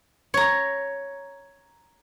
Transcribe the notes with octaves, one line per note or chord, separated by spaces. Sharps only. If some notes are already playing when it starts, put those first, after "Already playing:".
C#5 A#5